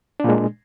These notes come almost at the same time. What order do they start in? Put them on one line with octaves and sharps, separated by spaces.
D4 A#2 G#3